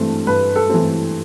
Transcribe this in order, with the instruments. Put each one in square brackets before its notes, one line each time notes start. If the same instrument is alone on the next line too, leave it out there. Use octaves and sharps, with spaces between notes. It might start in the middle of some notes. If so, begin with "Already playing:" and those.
Already playing: [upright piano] G2 E3 A3 C4
[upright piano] G2 [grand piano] B4
[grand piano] A4
[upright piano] E3 A3 C4